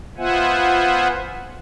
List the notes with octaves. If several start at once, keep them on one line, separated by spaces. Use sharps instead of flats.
B3 F4 C5 E5 F#5 G#5